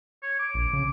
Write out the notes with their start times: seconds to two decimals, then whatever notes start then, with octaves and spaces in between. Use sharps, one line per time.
0.23 C#5
0.39 D6
0.54 A#1
0.73 C#3